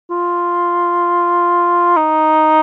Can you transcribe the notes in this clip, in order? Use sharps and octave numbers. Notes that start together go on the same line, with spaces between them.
F4
D#4